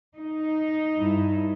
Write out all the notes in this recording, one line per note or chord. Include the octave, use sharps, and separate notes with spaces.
D#4
G2 E4